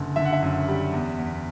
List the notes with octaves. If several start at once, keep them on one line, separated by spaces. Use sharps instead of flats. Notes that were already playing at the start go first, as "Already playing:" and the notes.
Already playing: F#1 D3
D3 E5
F#5
E5
F#2
G3
E2
E2